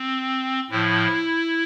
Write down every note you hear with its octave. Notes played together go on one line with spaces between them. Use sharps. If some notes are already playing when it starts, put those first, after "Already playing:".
Already playing: C4
A2 F3 E4